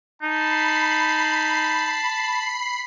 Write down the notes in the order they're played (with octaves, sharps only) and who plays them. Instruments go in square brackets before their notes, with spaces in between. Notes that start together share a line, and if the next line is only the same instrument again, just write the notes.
[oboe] D#4 [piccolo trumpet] A5 [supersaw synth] B5 C7